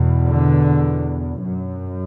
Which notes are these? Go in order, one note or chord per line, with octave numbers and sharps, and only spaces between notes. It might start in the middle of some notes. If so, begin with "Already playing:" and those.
Already playing: E2 B2
D3
F#2